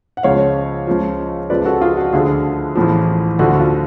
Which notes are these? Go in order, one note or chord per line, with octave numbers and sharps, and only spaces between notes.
F#5
C#2 C#3 F3 C#5 F5
C#2 C#3 F3
C#2 C#3 F3 B4 D5
F#4 A4
F4 G#4
F#4
D2 D3 F3 F4 G#4
A1 A2 F3
D2 D3 F3 F#4
F4